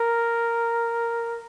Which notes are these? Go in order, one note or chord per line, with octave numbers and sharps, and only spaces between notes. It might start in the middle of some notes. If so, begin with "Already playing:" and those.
Already playing: A#4